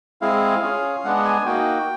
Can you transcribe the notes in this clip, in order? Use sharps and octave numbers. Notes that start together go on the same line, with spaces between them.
G#3 C4 E4 G#4 F5
C#4 F4 G#4
G#3 B3 D4 F#5
G#5
A#3 D#4 F#4 G5